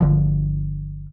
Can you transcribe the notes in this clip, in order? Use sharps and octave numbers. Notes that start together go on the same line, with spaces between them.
G1 D3 F3